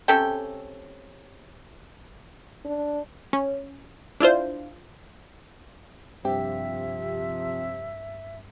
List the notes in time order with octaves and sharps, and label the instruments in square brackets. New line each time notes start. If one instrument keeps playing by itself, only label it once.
[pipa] C3 C#4 A4 G5
[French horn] D4
[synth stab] C#4
D4 E4 F4 C5
[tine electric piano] G2 [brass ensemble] C3 F3 [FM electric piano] C4 G4 [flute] E5